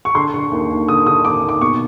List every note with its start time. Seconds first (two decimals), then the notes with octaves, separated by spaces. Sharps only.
0.05 C#6
0.15 D3 C6
0.34 D3 C#6
0.51 D#2
0.71 D#2
0.88 D3 D#6
1.06 D3 D#6
1.25 D#2 D6
1.42 D#2
1.49 D6
1.61 B2 C#6